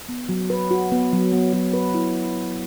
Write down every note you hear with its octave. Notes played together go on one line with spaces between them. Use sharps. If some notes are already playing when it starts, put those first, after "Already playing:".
B3
F#3
B4
F#4
B3
F#3
B3
F#3
B4
E4